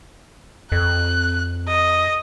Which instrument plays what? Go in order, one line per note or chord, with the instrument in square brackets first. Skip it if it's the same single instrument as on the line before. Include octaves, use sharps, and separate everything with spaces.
[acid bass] F2 [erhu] F#6
[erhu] D#5